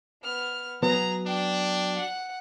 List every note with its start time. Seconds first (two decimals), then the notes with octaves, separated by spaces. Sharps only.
0.22 B3 F6
0.83 F#3 B3 G#4 A#5
1.26 D4 G5
1.97 F#5